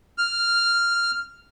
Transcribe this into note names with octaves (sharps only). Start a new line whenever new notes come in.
F6